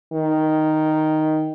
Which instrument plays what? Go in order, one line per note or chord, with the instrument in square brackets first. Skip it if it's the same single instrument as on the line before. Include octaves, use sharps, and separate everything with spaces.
[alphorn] D#3